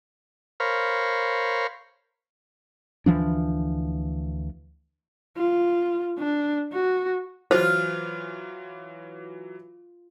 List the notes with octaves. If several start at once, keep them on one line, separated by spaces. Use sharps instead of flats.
A#4 C5 C#5 F5 B5
D2 E3 F3 D4
F4
D4
F#4
E3 F#3 F4 C5